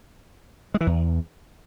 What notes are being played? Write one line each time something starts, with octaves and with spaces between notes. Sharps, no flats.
G#3
E3
E2